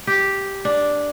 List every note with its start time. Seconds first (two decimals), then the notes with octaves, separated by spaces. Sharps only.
0.07 G4
0.65 D4